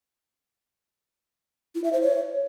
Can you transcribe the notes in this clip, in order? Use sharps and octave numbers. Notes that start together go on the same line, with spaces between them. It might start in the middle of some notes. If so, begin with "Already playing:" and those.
E4
E5
C5
C#5